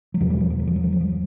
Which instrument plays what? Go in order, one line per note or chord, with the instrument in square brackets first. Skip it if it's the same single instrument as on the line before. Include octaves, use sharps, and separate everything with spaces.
[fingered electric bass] F#3
E2 B2 F3
G3
F3
F3
F#3
F3
F#3
F3
F#3
F3
F#3